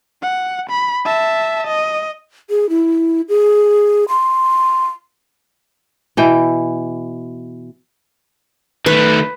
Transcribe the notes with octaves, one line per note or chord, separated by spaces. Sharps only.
F#5
B5
E5 A5
D#5
G#4
E4
G#4
C6
B2 E3 G5
D#3 A3 B4